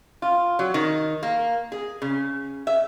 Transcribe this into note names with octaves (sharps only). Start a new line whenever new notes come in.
F4
F#3
D#3
A#3
G#4
C#3
E5